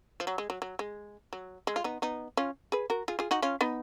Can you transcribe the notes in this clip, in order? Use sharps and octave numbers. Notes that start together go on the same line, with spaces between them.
F3
F#3
G#3
F#3
F#3
G#3
F#3
G#3
F4
B3 D#4
B3 D#4
C#4 F4
G#4 B4
F#4 A#4
F4 G#4
F4 G#4
D#4 F#4
C#4 F4
B3 D#4